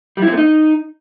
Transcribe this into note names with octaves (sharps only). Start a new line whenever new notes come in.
G3
E4
C4
A3
D#4